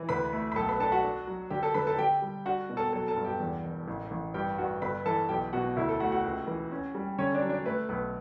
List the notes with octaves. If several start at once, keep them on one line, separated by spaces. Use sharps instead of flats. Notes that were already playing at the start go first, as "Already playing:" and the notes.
Already playing: E3
D2 B4 B5
A3
B5
B1 A4 A5
B4 B5
D4 A4 A5
F#4 F#5
D4
F#3
D3 G4 G5
A4 A5
D3 B4 B5
A4 A5
D3 G4 G5
G3
D4 F#4 F#5
B2
A4 A5
F#3 A4 A5
A4 A5
G2
G4 G5
E2
E1
A1
A1
G2 G4 G5
G2 F#4 F#5
G1 B4 B5
E3 A4 A5
B1 G4 G5
B2 F#4 F#5
D2 E4 E5
A4
A3 F#4 F#5
F#4 F#5
C#2
E3
C#4
G3
D3 C#4 C#5
D4 D5
F#3
D4 D5
A3 B4
B1 B4